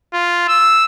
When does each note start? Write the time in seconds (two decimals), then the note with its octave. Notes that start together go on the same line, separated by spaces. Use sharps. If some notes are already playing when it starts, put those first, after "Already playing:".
0.13 F4
0.48 E6